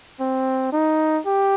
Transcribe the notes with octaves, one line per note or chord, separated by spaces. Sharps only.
C4
D#4
G4